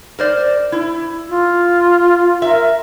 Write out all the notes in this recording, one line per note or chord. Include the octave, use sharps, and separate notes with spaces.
A#4 C5 D5
E4
F4
A#4 E5